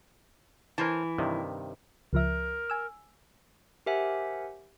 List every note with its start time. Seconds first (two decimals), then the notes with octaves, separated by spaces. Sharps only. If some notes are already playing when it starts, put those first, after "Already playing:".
0.78 E3 A#4 C5 A5
1.18 G2 C3 D#3
2.13 C#2 F3 A#4 E5
2.70 G#5 E6
3.86 G4 A#4 C5 E5 F#5 G#5